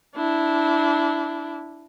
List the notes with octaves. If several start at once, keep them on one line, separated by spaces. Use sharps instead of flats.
D4 E4